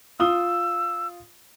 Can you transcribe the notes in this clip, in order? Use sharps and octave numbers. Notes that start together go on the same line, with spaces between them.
F4 D#6 E6 G7